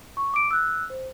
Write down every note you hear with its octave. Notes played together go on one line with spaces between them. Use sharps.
C#6
D6 D7
E6 F#6
C5